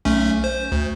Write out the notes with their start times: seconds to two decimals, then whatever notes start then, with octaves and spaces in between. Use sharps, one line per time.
0.05 B1 A3 C#4
0.44 C5
0.72 D2